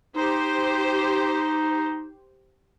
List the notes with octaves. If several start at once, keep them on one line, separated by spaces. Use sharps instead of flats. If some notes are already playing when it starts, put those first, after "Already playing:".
D#4 G4 C5